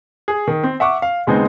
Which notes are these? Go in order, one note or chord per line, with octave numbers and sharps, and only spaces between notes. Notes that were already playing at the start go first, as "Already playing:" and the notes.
G#4
D#3
C4
E5 F#5 C#6 D6
F5
D#2 C#3 G#3 B3 C4 D#4